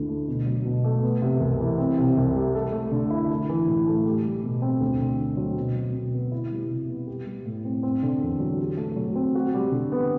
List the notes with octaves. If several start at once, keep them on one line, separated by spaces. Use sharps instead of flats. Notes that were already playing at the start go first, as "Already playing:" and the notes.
Already playing: D2 D3 D4 E4
A3
B2
F#3
B2
A3
B3
C3
C2
E3
C4
C3
C2
G3
A4
A3
D3
E4
E4
E3
A2
A3
G4
G3
B2
C4
D2
D3
D2
F#3
B2
F#3
B2
B3
E4
G3
C3
B3
G4
G3
A2
C4
C4
D3
E2
F#3
G4
A3
F#3
C4
F#4
G3
D3
B3